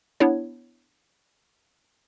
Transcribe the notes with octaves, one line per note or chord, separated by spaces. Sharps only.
B3 D4 E4 C#5